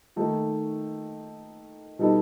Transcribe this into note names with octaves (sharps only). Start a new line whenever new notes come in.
D#3 A3 D#4 A4
B2 G3 D#4 A4